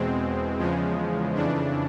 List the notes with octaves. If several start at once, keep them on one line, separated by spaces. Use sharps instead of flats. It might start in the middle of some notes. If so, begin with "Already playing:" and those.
Already playing: E2 B2 G#3 C4
E2 C#3 F3 G#3
F2 C#3 E3 D4